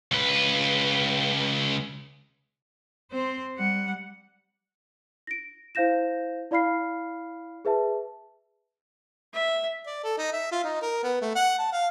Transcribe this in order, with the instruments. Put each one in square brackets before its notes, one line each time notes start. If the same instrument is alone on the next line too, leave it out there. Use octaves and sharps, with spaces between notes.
[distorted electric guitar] C#2 B4
[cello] C4 C5
G3 F#5
[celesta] A#6 D7
E4 C5 F5 G6 A#6 E7
E4 D5 F5 B5 F6 C7
G#4 B4 E5 A5
[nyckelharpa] E5
[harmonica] D5
A4
D#4
E5
F4
D#4
A#4
B3
A3
F#5
A5
F5